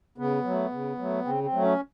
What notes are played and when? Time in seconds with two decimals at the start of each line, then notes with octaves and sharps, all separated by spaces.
0.18 C#3 B3
0.44 F#3 A3
0.72 C#3
0.98 F#3 A3
1.25 C#3 C4
1.43 C4
1.53 F#3 A3
1.62 C#4